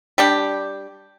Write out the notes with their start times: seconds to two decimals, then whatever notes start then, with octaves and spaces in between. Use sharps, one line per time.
0.18 G3 D4 G4